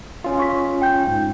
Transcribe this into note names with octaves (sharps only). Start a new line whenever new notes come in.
C#4 F4
C#6 B6
G5 G6
G#2